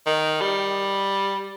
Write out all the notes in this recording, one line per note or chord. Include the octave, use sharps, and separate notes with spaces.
D#3
G3